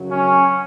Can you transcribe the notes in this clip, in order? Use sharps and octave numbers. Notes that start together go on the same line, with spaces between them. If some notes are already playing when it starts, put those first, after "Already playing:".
Already playing: F#2 C#3 F#3
C#4